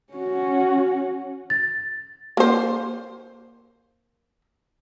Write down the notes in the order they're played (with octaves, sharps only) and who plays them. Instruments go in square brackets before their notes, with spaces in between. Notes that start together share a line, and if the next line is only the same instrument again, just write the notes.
[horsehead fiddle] C#4 F#4
[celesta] A6
[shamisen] A#3 C5